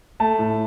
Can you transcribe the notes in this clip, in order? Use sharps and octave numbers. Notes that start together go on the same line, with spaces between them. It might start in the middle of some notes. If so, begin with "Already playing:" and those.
A3 A5
A2